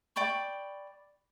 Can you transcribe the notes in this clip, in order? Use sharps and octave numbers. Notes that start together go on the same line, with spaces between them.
D5 G5 B5 C#6